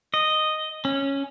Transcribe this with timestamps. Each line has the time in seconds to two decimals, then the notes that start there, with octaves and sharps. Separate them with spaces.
0.14 D#5
0.85 C#4